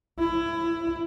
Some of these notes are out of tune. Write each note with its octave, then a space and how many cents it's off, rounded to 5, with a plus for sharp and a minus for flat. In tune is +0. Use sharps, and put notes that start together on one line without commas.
E4 +20